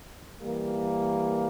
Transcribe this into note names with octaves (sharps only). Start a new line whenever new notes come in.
E3 G3 A#3